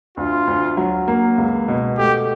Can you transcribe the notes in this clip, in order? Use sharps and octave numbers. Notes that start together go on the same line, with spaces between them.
D2 F4
D2
F#3
A#3
C#2
B2
A3 G4